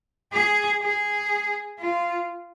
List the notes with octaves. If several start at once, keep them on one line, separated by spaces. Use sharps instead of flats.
G#4
G#4
F4